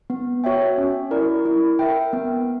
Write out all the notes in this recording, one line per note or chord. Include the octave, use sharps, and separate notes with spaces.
B3
F#4 C#5 E5 G5
C#4
E4 A#4 D5
E4
A#4 E5 G5
B3